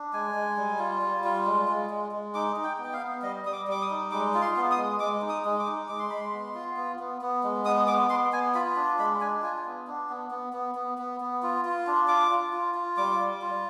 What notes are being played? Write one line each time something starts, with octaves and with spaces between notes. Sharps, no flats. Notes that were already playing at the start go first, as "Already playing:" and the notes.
Already playing: D4
G#3 G#5
G#3
G3
F4
G3
F4
G#3
G#3
G#3
G#3
D#4 D6
D#4
G5
B3
G5
F5
B3
G3 D#5
G3 D#6
D6
G3 D6
D#6
D#4
G#3 D6
F4
C6
B3
D#6
G#3
G#3 D6
D#4
D#6
G#3
D6
D#4
G#3 D6
C6
G#3 B5
C6
B3
F4
B3
B3
B3
G#3
B3 D#6
B3 D6
B3 C6
B3 G#5
F4 B5
D4
G#3 B5
D4 G#5
F4 G#5
B3
D4
B3
B3
B3
B3
B3
B3
F4
F4
D4
F4 D6
F4
F4
F4
G3 D6
G3
F4